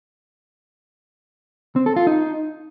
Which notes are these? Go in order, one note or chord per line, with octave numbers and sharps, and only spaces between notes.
C4
A4
F4
D#4